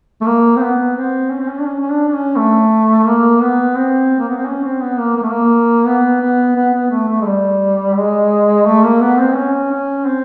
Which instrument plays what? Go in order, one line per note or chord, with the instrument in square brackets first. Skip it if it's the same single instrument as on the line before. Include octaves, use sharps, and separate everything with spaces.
[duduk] A3
A#3
C4
B3
C4
C#4
C4
C#4
D4
C#4
C#4
D4
D4
C#4
A3
A#3
B3
C4
A#3
B3
C4
C#4
C4
B3
A#3
A#3
A3
A#3
B3
B3
B3
B3
A3
A3
G#3
G3
G#3
A3
A#3
B3
C4
C#4
C#4
C4